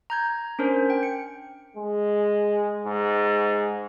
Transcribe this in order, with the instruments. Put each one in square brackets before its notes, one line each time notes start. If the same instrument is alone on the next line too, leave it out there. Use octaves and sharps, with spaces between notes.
[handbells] A#5 G6 G#6
C#4 D4 A#4 C5
G5
C#7
[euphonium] G#3
G#2